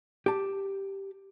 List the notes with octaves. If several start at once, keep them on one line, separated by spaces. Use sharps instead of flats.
G4 A5